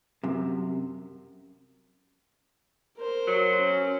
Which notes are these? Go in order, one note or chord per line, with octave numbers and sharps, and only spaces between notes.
F#2 C3
A#4 C5
F#3
C#4